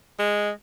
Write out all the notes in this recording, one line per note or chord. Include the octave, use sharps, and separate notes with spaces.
G#3